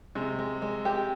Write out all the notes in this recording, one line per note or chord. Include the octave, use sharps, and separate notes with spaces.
C3 G#3
G#3
G#3
G4